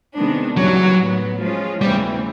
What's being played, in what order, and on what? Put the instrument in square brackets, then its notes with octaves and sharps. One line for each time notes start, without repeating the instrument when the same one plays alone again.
[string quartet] C3 D#3 G#3 B3 D4
[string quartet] D#2 C#3 E3 G3 [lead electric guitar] F#3
[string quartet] A2 F#3 B3
F3 G#3 C#4 F4
[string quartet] E2 C#3 E3 A3 C4 [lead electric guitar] G3